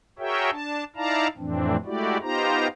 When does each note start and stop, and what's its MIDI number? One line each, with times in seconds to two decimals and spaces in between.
0.19 0.50 66
0.19 0.50 68
0.19 0.50 70
0.19 0.50 73
0.19 0.50 76
0.19 0.50 79
0.51 0.84 62
0.51 0.84 81
0.96 1.27 63
0.96 1.27 64
0.96 1.27 74
0.96 1.27 77
0.96 1.27 81
0.96 1.27 82
1.38 1.77 41
1.38 1.77 45
1.38 1.77 52
1.38 1.77 60
1.38 1.77 62
1.85 2.18 56
1.85 2.18 57
1.85 2.18 64
1.85 2.18 66
1.85 2.18 67
1.85 2.18 74
2.22 2.68 59
2.22 2.68 63
2.22 2.68 65
2.22 2.68 67
2.22 2.68 72
2.22 2.68 82